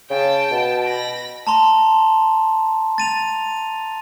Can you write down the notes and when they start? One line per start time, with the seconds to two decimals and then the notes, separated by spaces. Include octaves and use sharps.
0.10 C#3 G5 A5
0.51 B2
0.84 B5 A#6
1.47 A5 A#5 C6
2.98 A6 D#7 F7